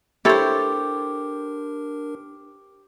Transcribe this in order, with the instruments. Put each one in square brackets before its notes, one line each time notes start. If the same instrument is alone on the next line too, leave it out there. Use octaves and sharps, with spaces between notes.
[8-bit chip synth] D4 A#4 [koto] E4 A4 C#5 [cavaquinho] G4 C5